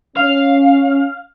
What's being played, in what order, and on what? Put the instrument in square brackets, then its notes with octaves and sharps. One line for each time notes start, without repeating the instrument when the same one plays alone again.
[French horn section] C#4 [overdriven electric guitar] F5